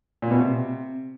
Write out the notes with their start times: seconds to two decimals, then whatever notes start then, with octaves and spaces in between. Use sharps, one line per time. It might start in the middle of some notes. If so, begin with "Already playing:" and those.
0.22 A#2
0.31 B2
0.39 C3